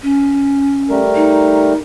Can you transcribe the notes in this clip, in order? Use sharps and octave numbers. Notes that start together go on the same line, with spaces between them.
C#4
G3 A3 A#4
D#4